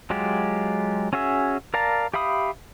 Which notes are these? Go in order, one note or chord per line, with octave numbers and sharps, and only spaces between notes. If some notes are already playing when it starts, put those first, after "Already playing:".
F#3 G#3 F4 G4
C#4 F#4 G#4 E5
A#4 D5 F5 A5 A#5
G4 E5 F5 B5 D#6